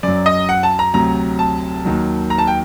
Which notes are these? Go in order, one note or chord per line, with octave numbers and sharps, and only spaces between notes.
F#2 F#3 D5
D#5
F#5
A5
A#5
D2 C3 F#3 A#5
A5
D#2 D#3 F#3
A#5
A5
G5